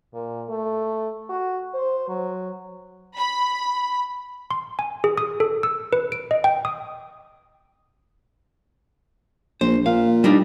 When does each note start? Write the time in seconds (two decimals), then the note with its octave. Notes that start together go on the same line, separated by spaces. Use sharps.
0.14 A#2
0.49 A3
1.30 F#4
1.74 C5
2.08 F#3
3.16 B5
4.51 C6
4.79 G#5
5.04 G#4
5.18 D#6
5.40 A4
5.63 E6
5.93 B4
6.12 D7
6.31 D#5
6.44 G5
6.65 D#6
9.61 A#1 C5
9.86 A#2 F5
10.24 G3 D4 D#4